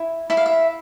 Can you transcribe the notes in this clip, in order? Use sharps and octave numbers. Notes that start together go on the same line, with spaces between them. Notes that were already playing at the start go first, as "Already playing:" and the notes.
Already playing: E4
E4 E5
F5
E5